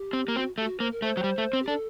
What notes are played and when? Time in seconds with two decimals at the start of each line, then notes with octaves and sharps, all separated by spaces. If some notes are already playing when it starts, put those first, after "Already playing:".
Already playing: G4
0.13 C4
0.28 A#3
0.36 C4 F#4
0.58 A3
0.60 G4
0.65 F#4
0.80 A#3 C5
0.92 A#4
1.02 A3 C5
1.17 F#3
1.24 G3
1.38 A3
1.53 C4
1.62 G4
1.68 D4 A4